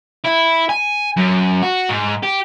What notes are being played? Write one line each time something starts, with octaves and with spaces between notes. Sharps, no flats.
E4
G#5
F#2
F#4
G#2
G4